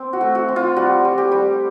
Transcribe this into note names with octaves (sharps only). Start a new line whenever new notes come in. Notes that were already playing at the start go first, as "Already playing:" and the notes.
Already playing: C4
F#4
A3
F#4
C4
F4
G3 F#4
G3
G4
G3